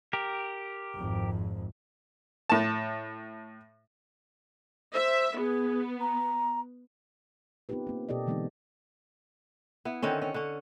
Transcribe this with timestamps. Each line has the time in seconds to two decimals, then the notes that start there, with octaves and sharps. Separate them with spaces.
0.13 G4 A#4
0.96 G#1 F2
2.50 A2 A5
4.94 C5 E5
5.37 B3 G#4
6.01 A#5
7.69 B3 C4 D#4 F4 G4 B4
7.87 A#3 C4
8.09 B2 G4 A4 D5 D#5
8.27 D3 E3 G#3 B3 C4 D#4
9.85 B3 E4
10.02 D3 D#3 C4 C#4
10.22 C#4
10.34 D3 C#4